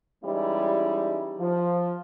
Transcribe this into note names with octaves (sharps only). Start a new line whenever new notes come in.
E3 G3 G#3 C#4 D#4 E4
F3